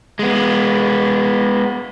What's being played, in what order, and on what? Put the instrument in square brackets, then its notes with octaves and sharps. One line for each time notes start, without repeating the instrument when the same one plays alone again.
[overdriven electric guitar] G#3 B3